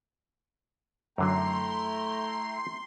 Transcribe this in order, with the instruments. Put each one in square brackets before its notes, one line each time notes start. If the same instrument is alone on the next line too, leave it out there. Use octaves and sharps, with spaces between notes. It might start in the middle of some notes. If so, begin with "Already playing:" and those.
[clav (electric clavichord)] F#2 D3 F#3 [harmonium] A3 [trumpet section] E4 G5 A#5 [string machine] C6